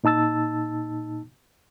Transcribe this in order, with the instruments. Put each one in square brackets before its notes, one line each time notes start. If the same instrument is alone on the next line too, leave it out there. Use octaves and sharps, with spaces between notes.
[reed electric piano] A#2 D#4 A5 E6 A6